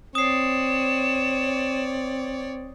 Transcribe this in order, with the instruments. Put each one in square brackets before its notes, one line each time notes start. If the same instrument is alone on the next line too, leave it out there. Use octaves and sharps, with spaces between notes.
[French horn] C4 [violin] C#5 D5 [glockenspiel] D#6 C7 [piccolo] E7